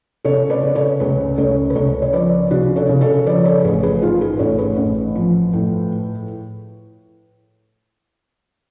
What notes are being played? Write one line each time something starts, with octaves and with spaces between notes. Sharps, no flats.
C#3 A4 C#5
B4 D5
C#3
A4 C#5
C#2 G#4 B4
C#2 A4 C#5
B4
C#2 A4 C#5
C#5
F3 B4 D5
C#3 D4 F#4
A4 C#5
C#3
A4 C#5
F3 B4 D5
A4 C#5
A1 G#4 B4
G#4 B4
G#2 F4 G#4
G#4 B4
A1 A4 C#5
G#4 B4
A1
F3
A2